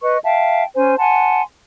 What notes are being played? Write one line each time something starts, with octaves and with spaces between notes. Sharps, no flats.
B4 D#5 C#6
E5 F5 G5 A5
C#4 C5 G#5
F#5 G#5 A5 C6